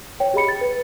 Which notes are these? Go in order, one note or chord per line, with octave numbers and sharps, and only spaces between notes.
C#5 G5
G4 G#4 D#5 B5 C#7
A6
B4